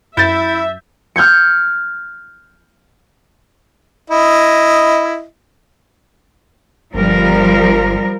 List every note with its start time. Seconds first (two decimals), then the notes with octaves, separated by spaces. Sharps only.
0.17 F#2 E4 E5 G6 A6
1.16 F6 G6 G#6 C#7
4.10 E4 D#5
6.94 G1 F3 G3 A#4